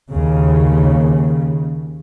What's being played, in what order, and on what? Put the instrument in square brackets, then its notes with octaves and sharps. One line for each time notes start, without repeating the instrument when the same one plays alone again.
[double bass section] D#2 C#3